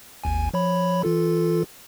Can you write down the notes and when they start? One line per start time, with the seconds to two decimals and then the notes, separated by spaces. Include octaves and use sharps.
0.24 G#1 D#2 G#5
0.54 F3 C#5 B5
1.03 E3 F4 A4